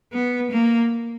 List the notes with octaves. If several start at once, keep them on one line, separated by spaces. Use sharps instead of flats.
B3
A#3